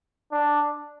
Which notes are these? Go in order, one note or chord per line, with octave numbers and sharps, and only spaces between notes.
D4